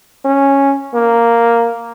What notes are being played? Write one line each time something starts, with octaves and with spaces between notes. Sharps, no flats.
C#4
A#3